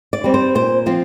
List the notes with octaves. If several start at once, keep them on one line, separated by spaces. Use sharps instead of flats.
D5
G3 C4
C5
A#2 C5
F3 C4 F4